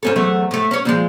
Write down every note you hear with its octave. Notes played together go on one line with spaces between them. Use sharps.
G#2 C#4 A4
E2 F#3 A3
A2 A3
C#4 C#5
A#2 F3 G#3